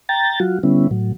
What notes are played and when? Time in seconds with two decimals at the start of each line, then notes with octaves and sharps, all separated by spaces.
0.09 G5 A#5 A6
0.40 F#3 F4 F#4
0.63 D3 G3 B3 C#4 E4
0.91 A2 F#3